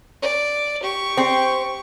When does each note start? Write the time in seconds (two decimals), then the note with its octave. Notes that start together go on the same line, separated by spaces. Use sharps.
0.22 D5
0.83 G4 C#6
1.17 C4